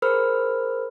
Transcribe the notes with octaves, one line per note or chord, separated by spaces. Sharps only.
G#4 A#4 C5 B5 E6 F6